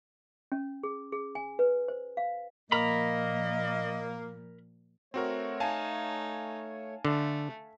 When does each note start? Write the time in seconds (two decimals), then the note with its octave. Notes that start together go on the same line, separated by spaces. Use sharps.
0.52 C#4
0.83 G#4
1.12 G#4
1.35 G#5
1.59 B4
1.88 C5
2.17 F5
2.72 A#2 F3 A#3 A#4 D#5 A#5 B5
5.14 A3 C4 F#4 A#4 C#5
5.60 D#4 F5 G#5 A5
7.05 D3 A3